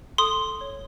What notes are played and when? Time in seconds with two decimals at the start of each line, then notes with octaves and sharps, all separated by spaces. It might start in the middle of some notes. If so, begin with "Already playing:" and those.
0.18 A4 C6 D#6
0.61 C#5